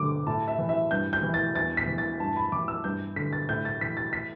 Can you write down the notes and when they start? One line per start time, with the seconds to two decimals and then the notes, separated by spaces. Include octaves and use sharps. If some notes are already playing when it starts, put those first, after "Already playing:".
Already playing: G2 D3 D6
0.27 A2 A5
0.48 E5
0.59 E3
0.69 E5
0.91 G2 G6
1.13 G6
1.23 E3
1.34 A6
1.55 E2 A6
1.77 B6
1.87 E3
1.98 A6
2.20 G2 A5
2.36 B5
2.52 E3 D6
2.68 E6
2.84 G2 G6
3.16 D3 B6
3.33 A6
3.49 A2 G6
3.65 A6
3.81 E3 B6
3.97 A6
4.13 B6